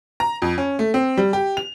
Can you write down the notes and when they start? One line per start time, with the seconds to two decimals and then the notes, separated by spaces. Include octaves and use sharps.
0.20 A#5
0.42 F2
0.58 C#4
0.79 A3
0.94 C4
1.17 G3
1.33 G4
1.57 F7